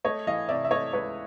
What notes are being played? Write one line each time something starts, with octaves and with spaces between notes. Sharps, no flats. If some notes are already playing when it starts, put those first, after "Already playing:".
A3 C#5 D#5
E3 D#5 F5
C3 D5 E5
E5
A3 C#5 D#5
C#2 B4 C#5